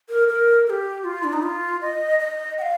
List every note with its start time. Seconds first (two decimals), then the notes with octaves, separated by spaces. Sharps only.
0.09 A#4
0.28 A#4
0.67 A#4
0.70 G4
1.04 F4
1.24 D4
1.33 D#4
1.43 F4
1.81 D#5
2.19 D#5
2.58 G5
2.62 F5